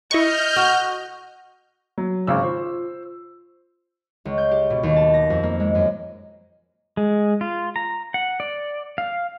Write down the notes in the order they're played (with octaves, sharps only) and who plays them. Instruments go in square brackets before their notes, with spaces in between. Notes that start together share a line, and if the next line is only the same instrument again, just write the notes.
[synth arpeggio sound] E4 C#6 [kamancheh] D#5 [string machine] F6 G6
[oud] F#4
[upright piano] F#3
[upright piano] G#1 C#3 E6 [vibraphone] C#6 D6
[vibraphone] F4 [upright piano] C5
[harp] C#2
G6
G4
B2
D#2
A5
A#6
F2
A#3
G#3
F#2
[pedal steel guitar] G#3
F4
A#5
F#5
D5
F5